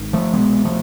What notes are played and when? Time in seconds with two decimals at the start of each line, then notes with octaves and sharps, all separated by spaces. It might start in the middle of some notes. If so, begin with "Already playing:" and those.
Already playing: G#1 G#2
0.13 F3 A3
0.34 C2 B2 G#3 B3
0.65 F3 A3